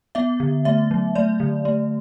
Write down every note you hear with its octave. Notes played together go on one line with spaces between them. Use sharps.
B3 E5
D3
A3 E5
F#3
A3 D5
D3
A3